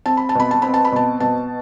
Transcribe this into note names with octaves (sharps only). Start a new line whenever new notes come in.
C4 A5
B5
A5
B2 B5
A5
C4 B5
A5
B5
B2 A5
B2 A5